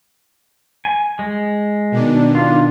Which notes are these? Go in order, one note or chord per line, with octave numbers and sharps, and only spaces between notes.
G#5
G#3
B2 D#3 D4
F4